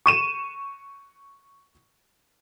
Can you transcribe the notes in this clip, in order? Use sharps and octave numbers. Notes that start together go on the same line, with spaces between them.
C#6 D#7 E7